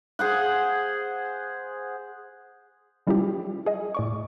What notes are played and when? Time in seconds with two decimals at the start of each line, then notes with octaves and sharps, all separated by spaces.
0.19 G#4 C5 F#5
3.07 F#3 G3 C#4 E4 F4 G4
3.66 G#4 D#5
3.95 A2 D5 C#6